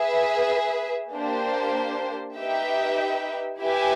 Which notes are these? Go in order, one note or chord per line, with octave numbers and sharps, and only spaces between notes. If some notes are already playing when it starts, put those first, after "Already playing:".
Already playing: G#4 B4 E5
A#3 D4 G4 C5
D#4 G4 B4 E5 G5
E4 G4 B4 E5 G#5